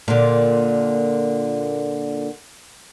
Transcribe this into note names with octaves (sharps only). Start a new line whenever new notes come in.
A#2 D3